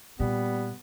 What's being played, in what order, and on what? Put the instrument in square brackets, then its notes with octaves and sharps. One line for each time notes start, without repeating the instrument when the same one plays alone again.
[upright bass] A#2 [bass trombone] G3 [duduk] B3